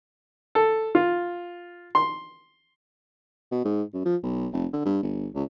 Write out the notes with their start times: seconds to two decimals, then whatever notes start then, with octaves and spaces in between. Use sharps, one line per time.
0.55 A4
0.95 F4
1.95 C6
3.52 B2
3.65 G#2
3.94 F#2
4.06 F3
4.23 B1
4.53 F1
4.73 D3
4.85 G2
5.03 G1
5.35 C#2